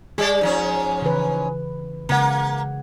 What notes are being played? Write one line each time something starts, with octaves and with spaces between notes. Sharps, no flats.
G3 G#4 D5
G#2 F3 C#4
C#3 E3 B4
C#3 G#3 A#3 F#5